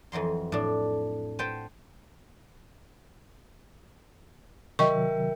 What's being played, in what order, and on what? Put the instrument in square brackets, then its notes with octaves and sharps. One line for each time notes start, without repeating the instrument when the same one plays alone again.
[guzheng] F2 E3 F#3 C6
A2 D4
B4 C5 F#5 G5 A5
[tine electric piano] C3 D#3 F#3 [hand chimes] A#4 E5 G5 [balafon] D#5 C#6